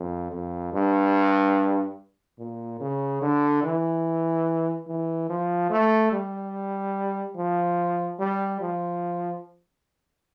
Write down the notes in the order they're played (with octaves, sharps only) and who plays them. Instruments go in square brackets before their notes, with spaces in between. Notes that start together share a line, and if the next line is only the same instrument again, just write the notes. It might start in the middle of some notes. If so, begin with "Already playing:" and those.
Already playing: [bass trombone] F2
F2
G2
A#2
C#3
D3
E3
E3
F3
A3
G3
F3
G3
F3